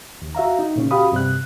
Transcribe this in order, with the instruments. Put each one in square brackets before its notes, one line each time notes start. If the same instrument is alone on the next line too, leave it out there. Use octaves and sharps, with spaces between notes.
[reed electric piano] D#2
F#4 E5 F5 A#5
D#4
A#2 C#3 C#4
F#4 G4 F5 B5 D#6
G2 C3 G3 F#6